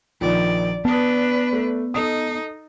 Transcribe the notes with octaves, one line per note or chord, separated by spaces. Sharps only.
A#1 D#3 F3 D5
B3 D4 B4 A5 D#6
A3
D#4 A4 D#5 D#6